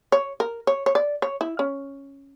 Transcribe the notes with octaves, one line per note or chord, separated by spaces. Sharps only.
C#5
A#4
C#5
C#5
D5
C#5
E4
C#4